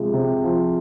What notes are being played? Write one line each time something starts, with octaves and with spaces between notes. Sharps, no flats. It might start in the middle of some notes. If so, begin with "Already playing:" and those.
Already playing: C3 F3 G#3
C3
F3